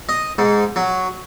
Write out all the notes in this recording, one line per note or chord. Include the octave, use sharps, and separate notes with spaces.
D#5
G#2
F#3